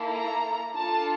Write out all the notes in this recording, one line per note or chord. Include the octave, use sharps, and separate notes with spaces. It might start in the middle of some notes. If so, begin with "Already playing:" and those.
Already playing: A#3 E4 A4
A#5
D4 F4 A4 A5